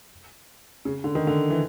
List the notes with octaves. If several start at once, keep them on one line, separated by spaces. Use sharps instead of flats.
C#3
D3
D#3
D3
E3